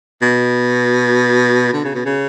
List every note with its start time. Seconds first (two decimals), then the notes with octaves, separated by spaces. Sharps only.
0.22 B2
1.73 D3
1.84 C#3
1.95 B2
2.06 C#3